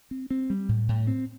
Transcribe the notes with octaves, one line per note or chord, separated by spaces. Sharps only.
C4
C4
G3
A2
A2
C4